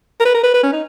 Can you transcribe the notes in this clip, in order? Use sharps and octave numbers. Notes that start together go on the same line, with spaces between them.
A#4
B4
A#4
B4
B4
C#4
D#4